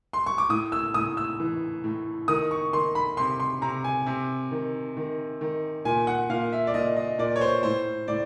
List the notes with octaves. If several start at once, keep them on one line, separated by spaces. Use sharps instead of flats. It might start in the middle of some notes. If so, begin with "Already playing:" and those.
C6
C#6
D6
A2 D#6
E6
A2 D#6
E6
E3
A2
D#3 D#6
C#6
D#3 C6
B5
C3 C6
C6
C3 A#5
G#5
C3
D#3
D#3
D#3
A#2 G#5
F#5
A#2 F5
E5
D5
A#2 D#5
D#5
A#2 D5
C#5
C5
A2 C5
A2 D5